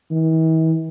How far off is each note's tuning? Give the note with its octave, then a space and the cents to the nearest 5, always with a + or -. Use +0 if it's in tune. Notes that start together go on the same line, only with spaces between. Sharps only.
E3 -45